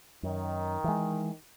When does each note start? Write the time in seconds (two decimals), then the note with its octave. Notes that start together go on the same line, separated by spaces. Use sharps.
0.23 F#2 D#3
0.84 E3 G#3